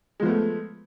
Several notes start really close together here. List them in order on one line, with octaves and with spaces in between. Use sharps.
G#3 F3 B3 A3